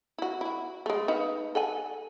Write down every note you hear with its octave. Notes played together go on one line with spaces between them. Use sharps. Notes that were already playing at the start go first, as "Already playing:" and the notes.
E4 F#4
E4 F#4
G#3 A3
D#4 B4 F5
A4 F#5 G#5